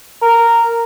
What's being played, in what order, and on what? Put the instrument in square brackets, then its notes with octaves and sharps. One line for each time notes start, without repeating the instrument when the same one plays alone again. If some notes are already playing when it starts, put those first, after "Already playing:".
[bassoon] A#4